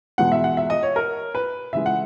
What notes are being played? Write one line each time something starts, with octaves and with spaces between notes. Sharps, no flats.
E2 B2 G#3 B3 F#5
E5
F#5
E5
D#5
C#5
A#4
B4
C#3 E3 G#3 E5
F#5